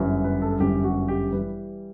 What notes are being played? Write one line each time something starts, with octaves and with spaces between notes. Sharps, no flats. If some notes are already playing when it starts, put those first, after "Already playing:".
Already playing: G1 F#2 E3 G3
B4
A4
G1 F#2 E3 G3 G4
F#4
G4
E3 G3 B4